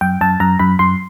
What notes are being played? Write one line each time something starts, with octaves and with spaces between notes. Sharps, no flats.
F#2 G5
F#2 A5
F#2 A#5
F#2 B5
F#2 C6